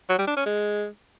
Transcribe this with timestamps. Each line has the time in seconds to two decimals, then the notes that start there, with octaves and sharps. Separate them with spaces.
0.09 F#3
0.18 G3
0.27 D4
0.37 C#4
0.46 G#3